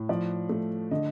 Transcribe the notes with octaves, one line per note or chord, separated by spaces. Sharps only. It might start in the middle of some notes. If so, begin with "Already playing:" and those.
Already playing: A2
F3 D5
A3
D3 D#5